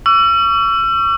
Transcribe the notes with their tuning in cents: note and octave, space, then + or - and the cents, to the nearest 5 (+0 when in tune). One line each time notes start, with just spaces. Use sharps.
C#6 +35 E6 +40